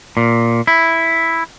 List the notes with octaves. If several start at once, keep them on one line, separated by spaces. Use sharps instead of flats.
A#2
E4